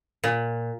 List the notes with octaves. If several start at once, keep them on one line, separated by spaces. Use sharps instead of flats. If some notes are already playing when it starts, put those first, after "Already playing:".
A#2